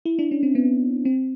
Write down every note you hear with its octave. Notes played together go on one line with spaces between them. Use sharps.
E4
D4
C#4
C4
B3
C4